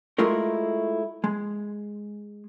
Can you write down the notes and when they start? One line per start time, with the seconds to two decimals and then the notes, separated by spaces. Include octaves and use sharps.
0.18 G#3 A3 E4 F4 A#4
1.24 G#3